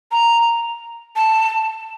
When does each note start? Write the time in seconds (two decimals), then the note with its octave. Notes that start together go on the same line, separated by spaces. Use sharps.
0.12 A#5
1.16 A5